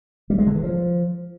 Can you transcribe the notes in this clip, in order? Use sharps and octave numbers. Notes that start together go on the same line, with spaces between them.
G3
G#3
D3
E3
F3